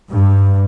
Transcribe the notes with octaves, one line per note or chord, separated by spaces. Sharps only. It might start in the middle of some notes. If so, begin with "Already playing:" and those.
G2